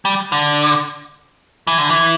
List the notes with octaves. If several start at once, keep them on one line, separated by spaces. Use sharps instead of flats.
G3
D3
E3
D3
E3